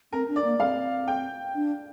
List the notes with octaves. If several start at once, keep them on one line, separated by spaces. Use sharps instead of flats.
C4 A#4
D4
D5
A#3
C4 F5
G5
D4